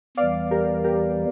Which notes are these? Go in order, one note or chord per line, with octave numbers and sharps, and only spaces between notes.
E2 E3 G3 D5 F5
G4 A#4
G4 A#4